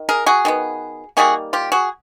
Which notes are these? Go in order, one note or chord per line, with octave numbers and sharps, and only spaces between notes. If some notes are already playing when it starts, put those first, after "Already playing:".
Already playing: D#3
G#4 A#4
F#4 G#4
D#3 G#3 B3
D#3 G3 A#3 F#4 G#4
F4 G4
F#4 G#4